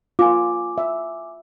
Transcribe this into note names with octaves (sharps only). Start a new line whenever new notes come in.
F4 G#5 D6
E5